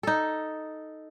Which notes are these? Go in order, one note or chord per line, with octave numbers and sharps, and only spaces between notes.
D#4 A4